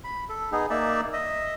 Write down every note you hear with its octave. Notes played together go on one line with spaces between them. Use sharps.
B5
A4
B3 D#4 G#4
A#3 D#4 D5 E5
D#5 E5